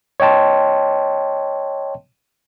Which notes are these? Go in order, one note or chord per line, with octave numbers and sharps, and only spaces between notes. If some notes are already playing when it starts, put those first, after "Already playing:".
C#5 D#5 G5 A5 C6